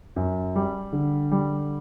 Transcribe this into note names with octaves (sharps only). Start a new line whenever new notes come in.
F#2
G3
D3
G3